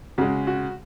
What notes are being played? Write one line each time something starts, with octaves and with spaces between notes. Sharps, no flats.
C#3 G#3 F#4
F#4